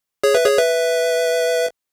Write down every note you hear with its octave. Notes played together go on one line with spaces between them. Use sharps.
G#4 C#5
B4 E5
G#4 C#5
B4 E5